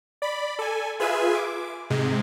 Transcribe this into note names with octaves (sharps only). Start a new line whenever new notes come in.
D5 B5
A4 G#5
F4 G#4 B4 E5 G#5
D6
G#2 C3 G#3